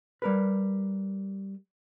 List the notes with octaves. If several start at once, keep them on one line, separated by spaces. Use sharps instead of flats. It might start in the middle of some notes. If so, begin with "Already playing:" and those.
G3 A#4 B4